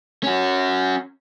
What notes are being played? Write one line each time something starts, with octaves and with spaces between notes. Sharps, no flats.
C#4 F#4